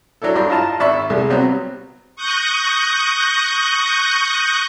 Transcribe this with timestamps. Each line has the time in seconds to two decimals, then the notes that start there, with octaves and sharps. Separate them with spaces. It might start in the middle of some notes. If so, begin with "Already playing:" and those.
0.22 F#3 D4 E4 A4
0.35 G2 D4 G4
0.49 E4 F4 D#5 A5 A#5
0.80 G#1 D5 E5 B5 C#6
1.10 C2 G3 G#3
1.30 C3 F#3 G3 B3 C4
2.16 C#6 D#6 F#6 G6 A#6